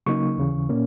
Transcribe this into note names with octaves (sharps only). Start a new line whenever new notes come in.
C#3 F#3 A#3 D#4 C#6
D#2 C#3 E3
A#2 A#3 C#4